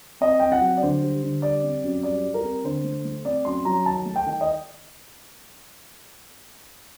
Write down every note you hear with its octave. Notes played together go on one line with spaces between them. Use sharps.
C4 D#5
C4 G5
F#5
F#3
D5
D3 C5
G3
D3
G3 D5
C4
F#2
G3 D5
G3
A#4
C4
D3 C5
A3
A3
C4 D5
F#2 C6
F#3 A#5
D#3 A5
A3
G5
D#3
D#5